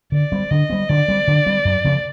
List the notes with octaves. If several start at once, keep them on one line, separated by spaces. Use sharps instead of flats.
D3 D5
G3 C4
D3 D#5
G3 C4
D3 D5
G3 C4
D3
G3 C4
F#2
C#3 F3 A3